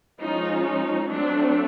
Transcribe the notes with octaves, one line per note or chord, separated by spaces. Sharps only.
F3 G#3 C#4 D#4 F4
D#4
F#3 A3 C4 D4